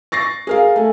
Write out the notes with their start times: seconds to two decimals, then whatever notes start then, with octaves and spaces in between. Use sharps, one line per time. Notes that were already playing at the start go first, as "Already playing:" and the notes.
0.12 C#6 A6 A#6 C7
0.47 G#4 A#4 F5
0.76 A3 G#5